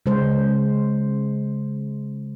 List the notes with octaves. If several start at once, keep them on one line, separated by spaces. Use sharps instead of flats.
C#3 G#3 C5